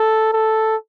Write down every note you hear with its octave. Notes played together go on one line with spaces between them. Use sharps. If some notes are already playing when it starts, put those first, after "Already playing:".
Already playing: A4
A4